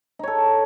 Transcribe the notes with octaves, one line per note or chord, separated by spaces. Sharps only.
D#4 A4 C#5